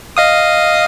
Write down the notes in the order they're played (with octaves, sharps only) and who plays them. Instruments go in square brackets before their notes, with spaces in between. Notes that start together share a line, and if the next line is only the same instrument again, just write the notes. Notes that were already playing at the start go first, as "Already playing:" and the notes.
[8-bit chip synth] D#5 F5 D#6